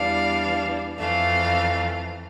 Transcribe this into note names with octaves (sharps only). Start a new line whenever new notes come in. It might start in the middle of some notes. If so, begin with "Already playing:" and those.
Already playing: E2 E3 G3 D4 F5
F2 E3 A3 F5